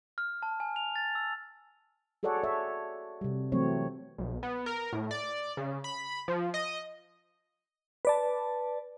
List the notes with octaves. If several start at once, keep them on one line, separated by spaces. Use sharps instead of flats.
F6
A5
G#5
F7
A6
E6
F#4 G#4 A4 C#5 D5 F#5
C#5 E5
C3 G3
E3 F#3 A3 C4 C#5
B1
B3
A#4
A2
D5
C#3
B5
F3
D#5
B4 D5 A5